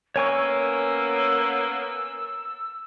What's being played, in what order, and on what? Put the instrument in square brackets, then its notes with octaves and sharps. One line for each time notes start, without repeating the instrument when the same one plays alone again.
[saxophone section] A#3 B3 C#4 [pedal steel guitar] C#5 G#5 C#6 [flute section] E6